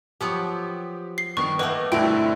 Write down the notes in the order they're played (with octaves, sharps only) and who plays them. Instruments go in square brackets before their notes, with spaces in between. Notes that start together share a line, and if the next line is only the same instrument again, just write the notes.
[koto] F3 F#3 B3 [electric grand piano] G4
[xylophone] C7
[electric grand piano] G2 B3 [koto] D#3 [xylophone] C#6
[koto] A3 A#3 [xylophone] B4 [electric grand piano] D#5 F#5 D6
[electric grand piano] G2 D3 A3 [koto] B2 C4 [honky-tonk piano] E4 [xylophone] G5